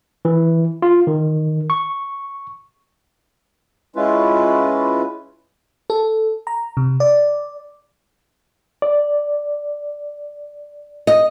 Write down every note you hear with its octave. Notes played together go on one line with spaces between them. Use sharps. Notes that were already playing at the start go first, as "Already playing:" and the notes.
E3
F4
D#3
C#6
G#3 C#4 E4 F4 B4
A4
A#5
C3
D5
D5
D#5